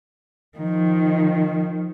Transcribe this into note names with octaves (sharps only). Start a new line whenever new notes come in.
D#3 F3